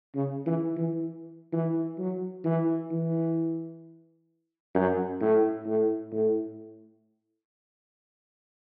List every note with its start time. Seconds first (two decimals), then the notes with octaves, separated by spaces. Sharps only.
0.15 C#3
0.46 E3
0.77 E3
1.52 E3
1.98 F#3
2.44 E3
2.91 E3
4.74 F#2
5.20 A2
5.66 A2
6.11 A2